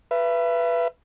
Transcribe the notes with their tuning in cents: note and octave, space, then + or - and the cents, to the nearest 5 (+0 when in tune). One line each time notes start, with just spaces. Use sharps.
B4 +0 E5 +35